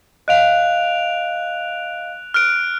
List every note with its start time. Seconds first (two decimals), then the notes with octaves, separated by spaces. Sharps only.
0.28 D#5 F5 F#6 D7 F7
2.34 F6 F#6 D7